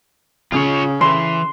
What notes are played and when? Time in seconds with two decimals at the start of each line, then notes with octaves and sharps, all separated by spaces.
0.52 C#3 F4 C#5
1.01 E3 C6